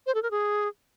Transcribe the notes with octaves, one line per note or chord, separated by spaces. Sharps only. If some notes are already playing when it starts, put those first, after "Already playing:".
C5
A4
A#4
G#4